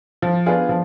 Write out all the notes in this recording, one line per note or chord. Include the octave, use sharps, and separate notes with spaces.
F3
B3 D4 F4 G#4
F3